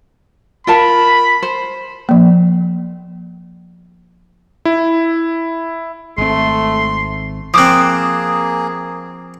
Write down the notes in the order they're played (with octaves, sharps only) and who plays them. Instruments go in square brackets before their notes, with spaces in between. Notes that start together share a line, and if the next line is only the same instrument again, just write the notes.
[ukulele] F4 A#4 A5 [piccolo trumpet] B5
[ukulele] C5
[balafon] F3 A#3
[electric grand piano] E4
[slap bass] G#1 C4 [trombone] A3 [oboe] C6
[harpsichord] F3 C4 [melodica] A#3 G#4 [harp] D6 F#6 [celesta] D#6